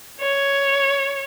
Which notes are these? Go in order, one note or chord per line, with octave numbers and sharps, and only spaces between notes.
C#5